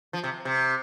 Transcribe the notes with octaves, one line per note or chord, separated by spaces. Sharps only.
F3
C3
C3